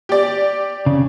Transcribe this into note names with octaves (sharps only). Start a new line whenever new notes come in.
G4 D5
C#3